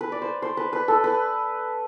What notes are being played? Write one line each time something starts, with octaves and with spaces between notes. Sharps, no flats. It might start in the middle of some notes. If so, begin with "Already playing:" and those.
B4
D5
C5
C5
B4
B4
A4
B4